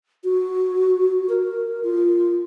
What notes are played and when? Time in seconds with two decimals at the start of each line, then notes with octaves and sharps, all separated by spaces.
0.24 F#4
1.29 A#4
1.84 F4